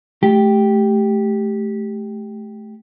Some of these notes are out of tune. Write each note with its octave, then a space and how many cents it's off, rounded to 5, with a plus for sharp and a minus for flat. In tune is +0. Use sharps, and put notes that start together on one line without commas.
A3 -25 G4 +0